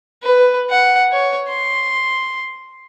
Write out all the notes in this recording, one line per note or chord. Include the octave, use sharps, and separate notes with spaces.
B4
F#5
C#5
C6